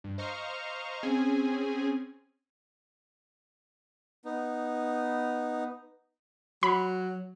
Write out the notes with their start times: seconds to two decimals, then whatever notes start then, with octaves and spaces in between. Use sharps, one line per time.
0.04 G2
0.18 C5 D#5 F5 A#5 C#6 F6
1.03 C4 C#4 G#4 G#5
4.25 B3 D#4
6.63 F#3 B5